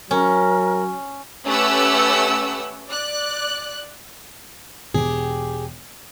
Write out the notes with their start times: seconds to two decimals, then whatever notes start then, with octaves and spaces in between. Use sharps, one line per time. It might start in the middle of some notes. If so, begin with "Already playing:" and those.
0.11 F#3 C#4 A#4
1.45 A3 C#4 G4 B4 F#5 E6
2.89 D5 F#6
4.94 E1 G4 G#4